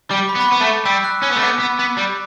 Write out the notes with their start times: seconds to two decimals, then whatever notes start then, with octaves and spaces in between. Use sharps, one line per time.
0.11 G3 D6
0.29 B5
0.35 B3
0.41 B5
0.48 C#6
0.52 B3
0.61 A3
0.67 C#6
0.85 G3 E6
1.04 F#6
1.23 C#4
1.31 B3
1.37 A3
1.42 B3 D6
1.60 B3
1.79 B3
1.98 G3